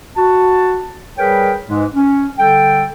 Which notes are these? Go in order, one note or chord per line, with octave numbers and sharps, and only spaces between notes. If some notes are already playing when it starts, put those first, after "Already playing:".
F#4 A5
G3 G#4 A#4 B4 C#5 G5
G#2 E3 G#3
C#4
D3 G3 A4 G5